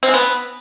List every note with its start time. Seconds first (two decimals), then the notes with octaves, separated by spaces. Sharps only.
0.03 C4
0.08 G#3
0.14 B3